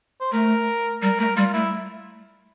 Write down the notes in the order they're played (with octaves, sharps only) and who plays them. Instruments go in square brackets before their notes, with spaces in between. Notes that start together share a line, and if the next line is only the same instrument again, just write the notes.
[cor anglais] C5
[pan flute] A3 [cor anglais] A#4
[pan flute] G3 [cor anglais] A#4
[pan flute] A3 [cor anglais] A#4
[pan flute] G3 [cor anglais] F4
[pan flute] A3 [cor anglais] E4